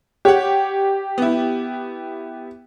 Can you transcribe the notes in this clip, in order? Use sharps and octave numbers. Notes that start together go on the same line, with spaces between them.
G4 C#5 F#5
B3 E4